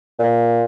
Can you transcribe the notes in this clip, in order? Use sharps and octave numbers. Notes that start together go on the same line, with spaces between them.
A#2